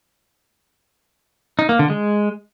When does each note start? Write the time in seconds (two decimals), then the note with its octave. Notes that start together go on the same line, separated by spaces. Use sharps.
1.59 D#4
1.69 A#3
1.79 D3
1.90 G#3